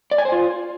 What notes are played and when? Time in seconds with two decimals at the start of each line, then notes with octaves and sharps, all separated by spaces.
0.11 D5
0.18 G#5
0.25 C5
0.32 F4